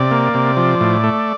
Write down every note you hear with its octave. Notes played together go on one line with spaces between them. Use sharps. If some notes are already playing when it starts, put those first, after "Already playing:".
Already playing: C3 D5
A#3
C3
F3
A2
A3